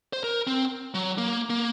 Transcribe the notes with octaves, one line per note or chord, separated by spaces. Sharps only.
C5
A#4
C4
F#3
A#3
A#3